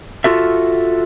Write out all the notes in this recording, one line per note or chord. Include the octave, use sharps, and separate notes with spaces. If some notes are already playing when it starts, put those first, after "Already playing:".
F4 F#4 A4 E5